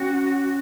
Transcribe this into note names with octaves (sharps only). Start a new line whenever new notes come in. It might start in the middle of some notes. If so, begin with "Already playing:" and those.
Already playing: C#4 F#4